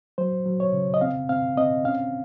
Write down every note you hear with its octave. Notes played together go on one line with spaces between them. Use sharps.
F#3 C5
F#3
C#5
C#3
D#5
C4 F5
C4 F5
C4 D#5
C#4 F5